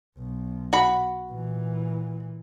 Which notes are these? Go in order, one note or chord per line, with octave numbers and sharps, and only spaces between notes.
B1
F#4 B5
A#2 E3